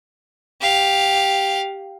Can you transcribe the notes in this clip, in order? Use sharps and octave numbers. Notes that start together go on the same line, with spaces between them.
G4 F5